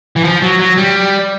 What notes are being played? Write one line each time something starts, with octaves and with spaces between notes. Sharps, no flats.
E3
F3
F#3
F#3
G3